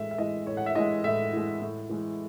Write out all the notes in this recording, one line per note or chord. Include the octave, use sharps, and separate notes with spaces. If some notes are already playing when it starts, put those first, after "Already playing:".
Already playing: A2 E3 G#3 E5
E5
E3 G#3 D#5
A2 C#5
F#5
E5
E3 G#3 D#5
A2 E5
E3 G#3
A2
E3 G#3